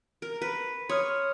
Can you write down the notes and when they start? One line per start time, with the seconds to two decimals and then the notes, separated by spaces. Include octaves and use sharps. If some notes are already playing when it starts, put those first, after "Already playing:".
0.22 A#4
0.42 B4
0.89 C#5 C6 D#6 F6